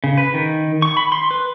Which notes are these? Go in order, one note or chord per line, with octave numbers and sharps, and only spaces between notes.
C#3
B4
D#3
C#6
B5
C6
B4